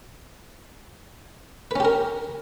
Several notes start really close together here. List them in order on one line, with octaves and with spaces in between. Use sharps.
B4 C#4 G4 A#4